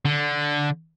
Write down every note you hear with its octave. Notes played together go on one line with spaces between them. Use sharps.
D3